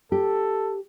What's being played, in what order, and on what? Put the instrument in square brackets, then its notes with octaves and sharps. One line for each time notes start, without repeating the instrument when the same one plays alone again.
[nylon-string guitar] G4 [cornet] A4